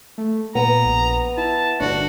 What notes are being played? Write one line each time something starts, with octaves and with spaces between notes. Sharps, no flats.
A3
A#2 B3 A#5
A#1
E4 A5
G1 D4 F#4